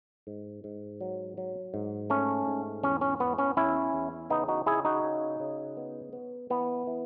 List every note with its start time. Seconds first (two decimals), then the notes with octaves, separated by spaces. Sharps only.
0.27 G#2
0.64 G#2
1.01 F#3
1.37 F#3
1.74 G#2
2.10 A3 C#4
2.47 G#2
2.83 E2 C#4
3.01 C#4
3.20 E2 B3
3.38 C#4
3.57 E2 C#4 E4
3.94 E2
4.30 C#3 B3 D#4
4.48 D#4 F#4
4.66 C#3 E4 G#4
4.85 D#4 F#4
5.04 C#3
5.40 C#3
5.77 B3
6.13 B3
6.50 E3 B3
6.87 E3